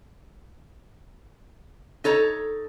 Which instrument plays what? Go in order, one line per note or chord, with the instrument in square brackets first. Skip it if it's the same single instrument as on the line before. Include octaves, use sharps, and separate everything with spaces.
[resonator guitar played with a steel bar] D#4 A4 C#5 A#5